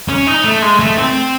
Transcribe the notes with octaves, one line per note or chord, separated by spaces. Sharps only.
C#4
D#4
A3
G#3
A3
C4